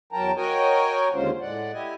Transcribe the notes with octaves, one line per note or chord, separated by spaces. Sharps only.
E2 F#3 A#4 G5 A5 A#5
F#4 A#4 C#5 D#5 G5 G#5
D#2 D3 G#3 C#4 F4 C5
A2 G#3 D5 F#5
E4 G4 D#5 G#5